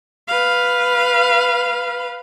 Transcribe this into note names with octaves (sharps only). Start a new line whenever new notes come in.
B4 F5